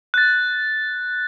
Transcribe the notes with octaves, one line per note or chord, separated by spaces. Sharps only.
F#6 A6